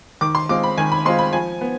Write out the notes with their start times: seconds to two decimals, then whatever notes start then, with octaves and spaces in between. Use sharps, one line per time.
0.21 D#3 D6
0.35 C6
0.49 G#3 C4 F4 D6
0.64 B5
0.78 D#3 G#5
0.92 B5
1.05 G#3 C4 F4 C6
1.19 B5
1.33 F3 G#5
1.61 B3